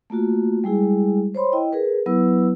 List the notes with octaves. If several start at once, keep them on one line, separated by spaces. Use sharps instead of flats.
A3 A#3 F4 F#4
G3 G#3 E4 G#4
C5 C#5 B5 C6
E4 D#5 G5
G#4 A#4 B4
F#3 B3 E4 B4 E6